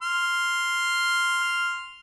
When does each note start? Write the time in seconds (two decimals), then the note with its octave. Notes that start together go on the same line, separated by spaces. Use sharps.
0.02 C6 F6